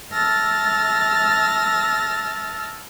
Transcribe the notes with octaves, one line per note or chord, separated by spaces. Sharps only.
E5 A5 E6 F6 A6 A#6